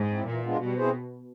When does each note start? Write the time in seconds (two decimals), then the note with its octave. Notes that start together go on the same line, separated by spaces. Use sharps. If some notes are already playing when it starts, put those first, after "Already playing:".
Already playing: G#2
0.10 C4 E4
0.27 A#2 E3
0.43 G#3 B3 D4 F4
0.60 B2 G3
0.77 C4 E4 G#4 C5